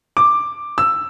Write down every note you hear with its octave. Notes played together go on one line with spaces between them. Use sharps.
D6
E6